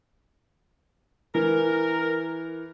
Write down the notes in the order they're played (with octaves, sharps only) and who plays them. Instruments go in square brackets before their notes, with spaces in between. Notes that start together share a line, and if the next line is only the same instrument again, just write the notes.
[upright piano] E3 [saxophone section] A#4